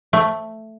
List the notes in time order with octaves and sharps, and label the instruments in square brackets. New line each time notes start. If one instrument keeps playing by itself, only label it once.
[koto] A3